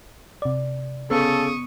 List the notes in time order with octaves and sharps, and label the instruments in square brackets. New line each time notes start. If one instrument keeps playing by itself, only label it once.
[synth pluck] C3 D5
[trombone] C#3 [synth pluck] B3 [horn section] A4 [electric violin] C#6 D#6